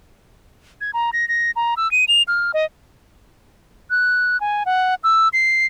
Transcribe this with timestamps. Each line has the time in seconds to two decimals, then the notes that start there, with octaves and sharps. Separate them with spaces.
0.81 G#6
0.94 A#5
1.13 A#6
1.28 A#6
1.56 A#5
1.77 E6
1.92 D#7
2.08 F7
2.28 F6
2.54 D#5
3.90 F#6
4.41 G#5
4.66 F#5
5.04 E6
5.33 C7